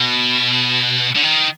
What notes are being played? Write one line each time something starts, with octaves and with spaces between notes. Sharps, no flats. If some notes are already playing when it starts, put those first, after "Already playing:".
Already playing: B2
D3
D#3